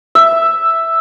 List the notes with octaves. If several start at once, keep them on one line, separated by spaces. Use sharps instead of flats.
E5